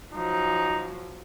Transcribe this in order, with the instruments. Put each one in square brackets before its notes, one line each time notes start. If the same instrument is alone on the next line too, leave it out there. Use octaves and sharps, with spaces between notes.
[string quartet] F3 F#3 [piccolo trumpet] D#4